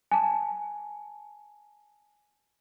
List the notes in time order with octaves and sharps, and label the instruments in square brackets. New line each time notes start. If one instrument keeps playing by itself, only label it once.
[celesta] G#5 A5